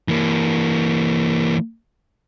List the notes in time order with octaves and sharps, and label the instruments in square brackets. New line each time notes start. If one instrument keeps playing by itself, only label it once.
[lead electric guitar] E3 A#3